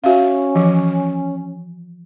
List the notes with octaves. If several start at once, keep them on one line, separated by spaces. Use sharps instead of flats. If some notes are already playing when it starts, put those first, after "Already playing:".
C#4 F#4 E5 F5
E3 F3